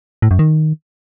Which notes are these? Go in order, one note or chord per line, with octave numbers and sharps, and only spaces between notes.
A2
F#2
D#3